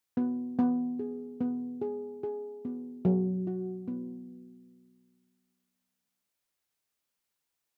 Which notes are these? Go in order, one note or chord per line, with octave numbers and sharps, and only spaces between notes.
B3
B3
G#4
B3
G#4
G#4
B3
F#3
F#4
B3